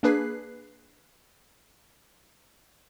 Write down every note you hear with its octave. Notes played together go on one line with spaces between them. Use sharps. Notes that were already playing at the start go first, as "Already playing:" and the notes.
A#3 D4 G#4 B4 F#6 C7